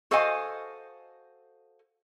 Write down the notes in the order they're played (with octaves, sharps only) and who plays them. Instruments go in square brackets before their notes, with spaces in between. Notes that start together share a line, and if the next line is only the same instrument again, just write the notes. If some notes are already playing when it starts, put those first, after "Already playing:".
[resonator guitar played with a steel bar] F#4 A4 C5 D#5 F5 G#5